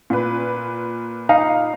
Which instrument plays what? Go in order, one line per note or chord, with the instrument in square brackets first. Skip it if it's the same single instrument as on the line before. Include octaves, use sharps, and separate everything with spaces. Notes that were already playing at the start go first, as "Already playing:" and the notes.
[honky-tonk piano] A#2 B4
[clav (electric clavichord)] D#4 [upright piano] F5